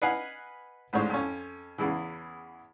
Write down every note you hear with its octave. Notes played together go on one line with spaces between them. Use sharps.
B4 D#5 F5 F#5 G#5
A1 D2 G#2 C5 C#5
F2 C#4
E2 C#3 E3